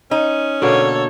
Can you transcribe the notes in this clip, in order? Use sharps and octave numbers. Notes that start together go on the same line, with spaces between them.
C#4 D#4
B2 D3 A#3 A4 C#5